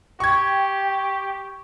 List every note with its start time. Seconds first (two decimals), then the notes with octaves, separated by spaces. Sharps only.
0.20 G4 G5 C#6 G#6